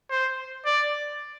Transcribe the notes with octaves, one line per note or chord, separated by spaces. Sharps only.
C5
D5